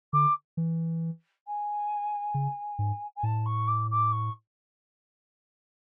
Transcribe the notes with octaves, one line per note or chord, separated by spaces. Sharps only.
D3 D6
E3
G#5
C#3
G#2
G#5
A2 A5
C#6
D6
D6
C#6